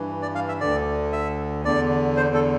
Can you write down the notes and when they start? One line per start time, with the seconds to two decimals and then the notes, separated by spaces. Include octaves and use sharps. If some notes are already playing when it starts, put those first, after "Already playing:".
Already playing: G2 E3
0.22 D5
0.35 F5
0.48 E5
0.61 D2 D3 D5
1.13 E5
1.65 E2 D3 D5
2.17 C5
2.34 A4